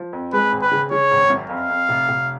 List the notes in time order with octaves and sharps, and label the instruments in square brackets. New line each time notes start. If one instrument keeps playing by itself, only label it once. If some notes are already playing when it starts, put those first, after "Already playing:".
Already playing: [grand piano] F3
F2
[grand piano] G#3 [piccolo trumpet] B4
[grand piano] G#1
[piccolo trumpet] B4
[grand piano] C#3
[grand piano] C#3 [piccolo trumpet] C#5
[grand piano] G#1
F#2
[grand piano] F2 [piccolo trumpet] F5
[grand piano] F2
F1
F1